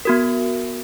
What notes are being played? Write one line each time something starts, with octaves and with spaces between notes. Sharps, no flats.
B3 F#4 A#4